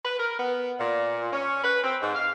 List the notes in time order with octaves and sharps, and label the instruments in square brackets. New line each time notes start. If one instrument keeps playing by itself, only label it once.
[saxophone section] B4
A#4
B3
A#2
C#4
B4
C4
G#2
F5